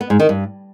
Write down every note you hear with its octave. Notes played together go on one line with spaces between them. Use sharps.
B3
G#2
D#3
G2